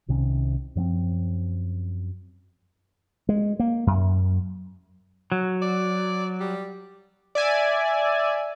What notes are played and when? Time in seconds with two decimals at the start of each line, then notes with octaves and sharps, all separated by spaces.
0.08 C2 C3 D#3 C#4
0.75 F#2 F3 B3 C4
3.29 G#3
3.59 A#3
3.87 F#2
5.32 F#3
5.62 D5
6.40 G3
7.35 D5 E5 G#5